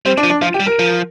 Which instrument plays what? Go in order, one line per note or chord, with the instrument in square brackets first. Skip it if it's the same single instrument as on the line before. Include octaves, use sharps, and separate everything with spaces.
[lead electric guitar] G3 [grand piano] C4
[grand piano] D4
[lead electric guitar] F3
[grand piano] D4
[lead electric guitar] F3 [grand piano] F4
[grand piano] G4
[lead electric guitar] G3
[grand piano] A#4
[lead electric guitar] F3